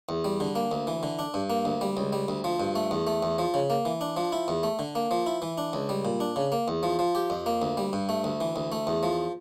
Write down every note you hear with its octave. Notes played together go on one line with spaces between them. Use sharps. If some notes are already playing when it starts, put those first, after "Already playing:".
E2
G3
D3
A#3
D2
E3
D3
D4
G2
A#3
D2
G3
C#2
G3
D2
F3
G2
A3
E2
A3
E2
F3
C#3
A#3
E3
D4
F3
E4
E2
A3
D3
A#3
F3
E4
E3
D4
C#2
G3
A#2
D4
C#3
A#3
E2
F3
F3
G4
F2
A#3
D2
G3
G2
A3
D2
E3
D2
A3
E2
F3